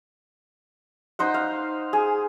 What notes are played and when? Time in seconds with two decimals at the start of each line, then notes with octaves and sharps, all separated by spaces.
1.19 D#4 C5 F#5
1.34 F5
1.93 G#4